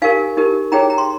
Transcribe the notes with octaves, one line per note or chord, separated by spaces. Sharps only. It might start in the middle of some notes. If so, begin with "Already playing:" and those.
D#4 G4 A#4 F5 G#5
D#4 G4 A#4
D#4 G#4 C#5 G5 A#5
A#5
C6